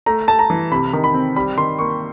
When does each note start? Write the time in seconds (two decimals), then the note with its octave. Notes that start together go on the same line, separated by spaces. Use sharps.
0.06 A3 A#5
0.28 A3 A5
0.39 A#5
0.50 E3
0.71 C3 B5
0.93 D#3
1.04 B5
1.14 C4
1.36 G3 B5
1.58 D#3 C6
1.79 A#3 C#6